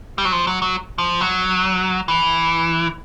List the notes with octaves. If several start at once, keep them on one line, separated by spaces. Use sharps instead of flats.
G3
F#3
F3
F#3
F#3
F3
F#3
E3